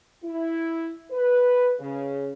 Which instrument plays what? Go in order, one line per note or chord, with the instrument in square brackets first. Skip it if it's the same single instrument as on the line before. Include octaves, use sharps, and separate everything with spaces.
[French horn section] E4
B4
C#3